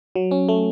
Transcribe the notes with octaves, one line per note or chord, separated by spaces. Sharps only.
F#3
C#4
A3